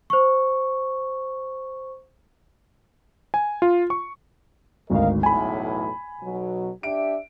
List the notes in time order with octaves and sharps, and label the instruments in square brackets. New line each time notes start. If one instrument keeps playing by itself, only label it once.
[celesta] C5 C#6
[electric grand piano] G#5
F4
C#6
[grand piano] G#1 D2 [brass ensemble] A#4 D#5 F5
[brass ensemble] B1 E2 A2 [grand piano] G#5 B5
[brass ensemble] B1 B2 F#3
[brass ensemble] D4 G4 E5 [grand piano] D7